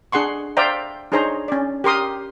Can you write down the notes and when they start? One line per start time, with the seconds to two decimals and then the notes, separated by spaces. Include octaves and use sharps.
0.12 D4 G#4 F#5 C6 C#6
0.57 C5 D5 E5 F5 G5 A#5
1.12 D4 D#4 G#4 C5 C#5 A#5
1.48 C#4 D5
1.84 G4 A#4 C6 D#6